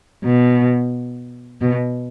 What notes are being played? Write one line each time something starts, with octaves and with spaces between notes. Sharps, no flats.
B2
B2